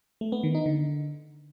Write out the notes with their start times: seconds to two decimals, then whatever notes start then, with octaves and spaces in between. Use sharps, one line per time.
0.21 A3
0.32 B3
0.43 D#3
0.55 D#4
0.66 D3